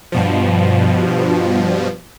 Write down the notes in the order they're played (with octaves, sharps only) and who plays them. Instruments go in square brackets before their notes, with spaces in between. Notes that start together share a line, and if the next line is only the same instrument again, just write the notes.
[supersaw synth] G2 B2 F3